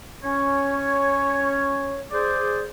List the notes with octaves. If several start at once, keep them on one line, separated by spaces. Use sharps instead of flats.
C#4 C#5
G#4 C5 D5